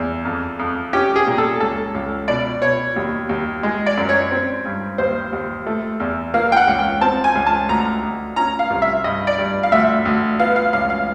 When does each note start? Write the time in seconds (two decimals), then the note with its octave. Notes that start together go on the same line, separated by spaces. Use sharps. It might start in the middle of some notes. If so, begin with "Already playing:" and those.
Already playing: E2
0.25 F2
0.59 F2
0.93 C#4 G4
1.16 G#4
1.27 A#2
1.38 A4
1.60 C#2 A4
1.94 C#2
2.28 B2 D5
2.62 B2 C#5
2.96 D#2
3.29 D#2
3.63 G#3
3.86 D5
3.97 F#2
4.09 C#5
4.31 C4
4.65 G2
4.98 D#2 C5
5.33 D#2
5.66 A3
6.00 E2
6.34 A#3 F5
6.52 G5
6.57 F#5
6.67 C#2
6.79 G5
7.01 C4 A5
7.24 G#5
7.35 C#2
7.47 A5
7.69 D2 A#5
8.03 D2
8.36 C#4 A#5
8.59 F5
8.70 C2
8.82 E5
9.04 G2 D#5
9.27 D5
9.38 G2
9.63 F5
9.72 D2 E5
10.05 D2
10.39 B3 F5
10.56 F5
10.73 C#2 F5
10.90 F5